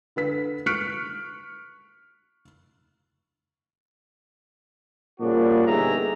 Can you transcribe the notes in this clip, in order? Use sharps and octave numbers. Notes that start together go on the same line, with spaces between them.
D3 B4 B6
C#6 F6 F#6 B6 C#7 D7
A#2 C#3 F3 G3 D4 F#4
G1 D#4 G4 G#4 E5 A#5